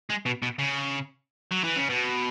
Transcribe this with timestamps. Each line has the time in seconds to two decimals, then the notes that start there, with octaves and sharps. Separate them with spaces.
0.10 G#3
0.26 B2
0.42 B2
0.59 C#3
1.51 F#3
1.64 E3
1.76 C#3
1.89 B2